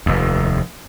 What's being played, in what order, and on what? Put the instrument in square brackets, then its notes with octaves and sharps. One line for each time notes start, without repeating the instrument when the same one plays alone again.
[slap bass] F1 D#2